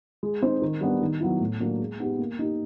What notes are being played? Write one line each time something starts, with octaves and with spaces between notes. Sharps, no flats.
G#3
C4 D#4 G#4 C5
D#3
G3 B3 D4
D#3
F#3 B3 E4
A2
F#3 A#3 D4
G#3
B3 D#4 G4
A#3
D#4 G4